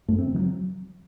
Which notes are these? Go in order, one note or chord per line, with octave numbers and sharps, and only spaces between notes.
F#2 A3
C4
C#3
E3
F#3